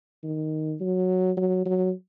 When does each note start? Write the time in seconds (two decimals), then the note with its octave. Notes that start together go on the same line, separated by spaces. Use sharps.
0.24 D#3
0.80 F#3
1.37 F#3
1.65 F#3